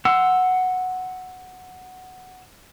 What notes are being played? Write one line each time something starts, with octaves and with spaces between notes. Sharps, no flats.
F#5 C6 E6